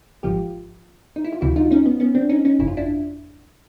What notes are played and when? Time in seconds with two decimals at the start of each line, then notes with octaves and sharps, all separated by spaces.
0.23 G#1 G#2 F3 F4 G4
1.16 D#4
1.24 E4
1.33 F4
1.41 D2 C3 E3 E4 F#4
1.56 D#4 F4
1.71 C#4 D#4
1.86 B3
2.00 B3 C#4
2.15 C4 D4
2.29 C#4 D#4
2.45 C#4 D#4
2.59 G1 F2 C#3 E4
2.68 F4
2.77 D4 E4